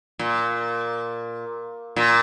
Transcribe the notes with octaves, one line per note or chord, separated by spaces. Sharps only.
A#2
A#2